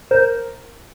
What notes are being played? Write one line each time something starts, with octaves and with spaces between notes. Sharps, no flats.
A#4 C5